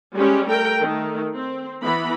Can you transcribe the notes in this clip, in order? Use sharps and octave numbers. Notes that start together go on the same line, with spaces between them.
G3 G#3 C#4 G4
A3 A#4 G5
D#3 A3
C4
E3 B3 B5